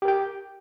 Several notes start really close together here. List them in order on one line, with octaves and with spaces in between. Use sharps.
G4 A#4 G5